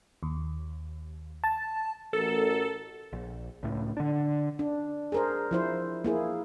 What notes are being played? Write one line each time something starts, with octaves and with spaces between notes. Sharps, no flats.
D#2
A5
A1 F#4 A4 A#4
A#1
C#2 A2
D3 D4
D4
G#4 A#4 C5
F3 E4 C5
A#3 E4 G#4